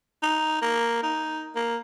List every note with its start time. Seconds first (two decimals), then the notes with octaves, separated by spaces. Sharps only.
0.23 D#4
0.62 A#3
1.03 D#4
1.55 A#3